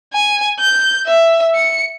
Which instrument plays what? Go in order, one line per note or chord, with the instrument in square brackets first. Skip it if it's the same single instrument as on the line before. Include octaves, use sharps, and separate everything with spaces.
[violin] G#5
G6
E5
C#7